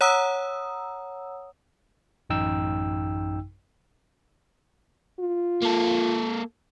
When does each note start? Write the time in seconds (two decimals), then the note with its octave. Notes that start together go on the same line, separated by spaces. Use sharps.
0.01 C#5 F#5 A#5 D#6 E6
2.30 A1 F#2 D#4 G5 E6
5.20 F4
5.62 A#3 A4